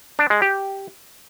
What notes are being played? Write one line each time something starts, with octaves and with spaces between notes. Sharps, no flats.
D4
G#3
G4